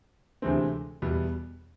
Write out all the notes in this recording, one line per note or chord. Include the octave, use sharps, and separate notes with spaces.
D2 C3 E3 G#3 C4
E2 B2 G3 B3